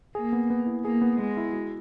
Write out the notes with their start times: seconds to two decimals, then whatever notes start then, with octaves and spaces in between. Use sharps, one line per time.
0.15 A#3 G#4
0.33 B3
0.50 B3
0.66 E4
0.85 A#3 G#4
1.01 B3
1.19 G#3 B3
1.37 E4
1.53 F#4